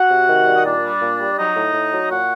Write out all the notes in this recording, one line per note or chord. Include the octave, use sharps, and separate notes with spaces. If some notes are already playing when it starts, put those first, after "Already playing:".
Already playing: F#4 F#5
C3
D#3
G3
D#5
A#2 D4 D5
G3
A#2
G3
D5
F#3 D#4 D#5
A2
A2
F#3
A#2 F#4 F#5